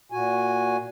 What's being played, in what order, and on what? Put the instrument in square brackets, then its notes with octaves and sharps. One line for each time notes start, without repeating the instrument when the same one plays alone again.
[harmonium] A#2 F#4 G#5